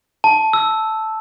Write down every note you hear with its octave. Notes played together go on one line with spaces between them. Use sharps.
A5
E6